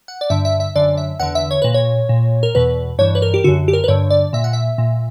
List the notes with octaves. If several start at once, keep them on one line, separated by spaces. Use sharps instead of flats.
F#5
D5
G2 D3 E5
E5
E5
F#2 D3 D5
E5
E2 D3 F#5
E5
C#5
A#2 B4
C#5
A#2
A#4
E2 B2 B4
G2 E3 C#5
B4
A#4
G4
F#2 D3 F#4
G4
A#4
B4
G2 D3 C#5
D5
A#2 E5
F#5
E5
A#2